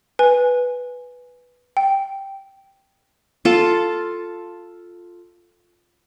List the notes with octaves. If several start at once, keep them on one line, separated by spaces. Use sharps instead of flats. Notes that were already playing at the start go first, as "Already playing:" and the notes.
B4 G#5
G5
F4 A4